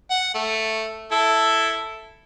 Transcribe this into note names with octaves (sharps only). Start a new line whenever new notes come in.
F#5
A3
E4 A4